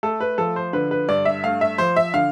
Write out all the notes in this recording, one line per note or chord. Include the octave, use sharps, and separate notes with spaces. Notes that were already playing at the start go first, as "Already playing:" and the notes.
A3 A4
B4
F3 A4
C5
D3 B4
B4
G2 D5
E5
A3 F5
E5
F3 C5
E5
D3 F5